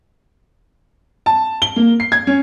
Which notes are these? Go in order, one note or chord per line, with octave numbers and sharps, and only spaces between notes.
A5
G7
A#3
C7
G#6
C#4